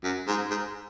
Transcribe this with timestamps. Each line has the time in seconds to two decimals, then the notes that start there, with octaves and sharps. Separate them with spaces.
0.04 F#2
0.27 G#2
0.50 G#2